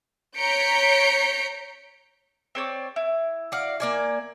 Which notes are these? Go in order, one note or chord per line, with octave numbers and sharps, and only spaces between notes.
C#5 A#5 G6 B6 C#7 D7
C4 C#5 D5
E4
F#4 D5 F5
A#3 D5 G#5